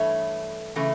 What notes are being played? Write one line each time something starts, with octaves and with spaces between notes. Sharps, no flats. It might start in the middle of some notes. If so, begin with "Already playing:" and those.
Already playing: G2 E3 A3 C#5
C#3 E3 A3